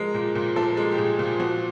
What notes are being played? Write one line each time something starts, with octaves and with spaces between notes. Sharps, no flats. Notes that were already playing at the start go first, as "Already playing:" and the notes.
Already playing: F3 G#3 A#4
A#2
A#2
F3 A4
G#3
G4
A#2 G#4
A#2
F3 F#4